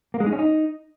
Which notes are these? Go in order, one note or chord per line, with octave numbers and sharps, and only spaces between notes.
A#3
G#3
D#4
C#4
D#4